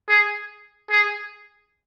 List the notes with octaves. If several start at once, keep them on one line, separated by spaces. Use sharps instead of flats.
G#4
G#4